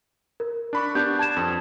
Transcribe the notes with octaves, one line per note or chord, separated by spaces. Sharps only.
A#4
D4 B5 C#6
B3 D4 G4 G6
A5 G#6 E7
F2